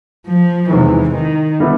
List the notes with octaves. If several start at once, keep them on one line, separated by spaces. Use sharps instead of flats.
F3
E2 C3 D#3 E3 G#3
D#3
D3 G3 B3 E4